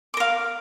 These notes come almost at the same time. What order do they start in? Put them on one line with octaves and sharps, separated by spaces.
D6 A#4 F5